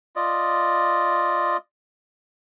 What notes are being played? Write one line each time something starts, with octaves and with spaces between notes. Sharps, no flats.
F4 D5 D#5